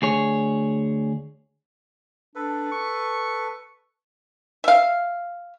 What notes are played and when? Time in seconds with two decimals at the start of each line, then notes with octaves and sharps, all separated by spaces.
0.02 D2 G#4 C#5
2.35 D4 A4 B4
2.72 C#6
4.64 E5 F5